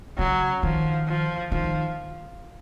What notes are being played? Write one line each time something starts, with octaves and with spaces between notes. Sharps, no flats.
C#3 F#3
D#3 F3
F3
D#3 F3